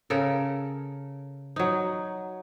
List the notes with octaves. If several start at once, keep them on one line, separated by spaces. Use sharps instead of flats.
C#3 A4 A#4
F#3 D#4